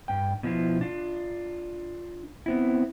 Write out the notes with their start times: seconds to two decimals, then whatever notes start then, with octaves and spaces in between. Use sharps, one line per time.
0.08 G2 G5
0.43 B2 F3 G#3 E4 F4
0.81 D4 F4
2.46 B3 C4 E4